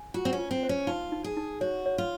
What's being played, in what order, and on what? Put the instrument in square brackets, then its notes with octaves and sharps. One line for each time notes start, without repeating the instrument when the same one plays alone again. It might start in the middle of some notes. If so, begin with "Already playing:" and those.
Already playing: [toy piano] G#5
[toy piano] F4 [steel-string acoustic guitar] F#4
[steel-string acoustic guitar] C4
C#4
[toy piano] F4
[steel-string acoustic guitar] C4
[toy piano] C5
[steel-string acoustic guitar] C#4
[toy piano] D#4 [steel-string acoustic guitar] F4
[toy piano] D#4
[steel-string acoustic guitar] G#4
[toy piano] D#4
[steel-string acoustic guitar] F#4 [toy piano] C#5
[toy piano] C#5
[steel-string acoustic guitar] F4